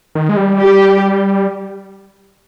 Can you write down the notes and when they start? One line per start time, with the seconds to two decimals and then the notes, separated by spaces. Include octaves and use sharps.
0.15 D#3
0.29 G#3
0.37 G3
0.60 G4